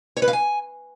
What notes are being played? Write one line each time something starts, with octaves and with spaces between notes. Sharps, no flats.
C#5
B4
F5
G#5